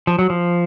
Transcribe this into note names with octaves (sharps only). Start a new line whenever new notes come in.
F3
F#3
F3